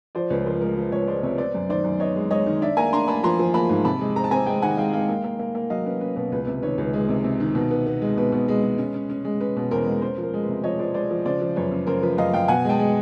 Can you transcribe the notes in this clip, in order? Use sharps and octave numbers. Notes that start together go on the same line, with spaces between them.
F3 C5 D5
C#2 B4 C#5
F3 A#4 C5
G#3 A#4
F3 B4
C#2 B4 C#5
G#3 C5 D5
C3 B4 C#5
B3 C5 D5
F#2
D#3 C5 D5
F#2
B3 C#5 D#5
G#3
G#3 C#5 D#5
D#3
D4 D5 E5
A#3 G#5 A#5
D4 A#5 C6
A#3 A5 B5
F3 A#5 C6
F3
A#3 A5 B5
G#2
C3 A5 B5
G#3
C4 A#5
A5
C4 G#5 A#5
G#3 G5 A5
D#3 F#5 G#5
G#3 F5 G5
G#3 F5 G5
A#3
A#3
A#3
A#3
F#3 D#5 F5
C#4 B4
C#4 B4
B2 B4
C#2 B4
C3
D#3 B4 C#5
C#2
G#3
C3
C3
D#3
B2
B3
B3
G#3
B2 B4
B2
G#3
G#3
C#4
C#4
C#4
G#3
C#4 B4
B2
E2 A#4 C5
G#3
C#4 A#4 C5
F3
A#4
G#3
B4
C3
F3 C#5 D#5
F3 C5 D5
G#3 C5 D5
F3
C#3 C5 D5
F3
F#2 B4 C#5
C#3
C#3 A#4 C5
F3 B4
F#2 D#5 F5
F#2 F5 G5
B2 F#5 G#5
G#3 G5 A5
G#3